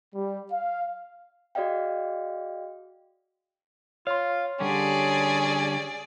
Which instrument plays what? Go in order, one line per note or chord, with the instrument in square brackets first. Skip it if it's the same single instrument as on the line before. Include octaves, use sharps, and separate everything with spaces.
[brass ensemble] G3
F5
[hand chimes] F#4 G#4 D5 D#5 F5 G5
[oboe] F4 [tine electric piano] C#5 C6 [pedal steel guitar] F5
[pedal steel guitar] D3 G3 G4 [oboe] C#4 [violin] G#4 D5